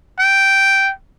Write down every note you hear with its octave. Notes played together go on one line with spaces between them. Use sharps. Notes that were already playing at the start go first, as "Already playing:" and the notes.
G5